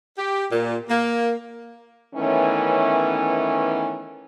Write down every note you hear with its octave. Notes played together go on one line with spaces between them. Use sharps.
G4
A#2
A#3
D#3 E3 A3 B3 C#4